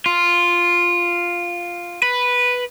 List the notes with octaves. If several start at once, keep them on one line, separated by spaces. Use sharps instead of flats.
F4
B4